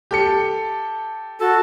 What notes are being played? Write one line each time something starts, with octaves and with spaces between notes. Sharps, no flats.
G4 A4 C#7
F#4 A4